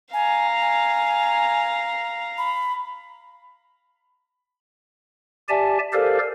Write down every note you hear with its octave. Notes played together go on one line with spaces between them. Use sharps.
F5 G#5 A#5
G#5
B5
G4 D5 E5 G#5 A5
G4 A4 A#4 C5 D5 F5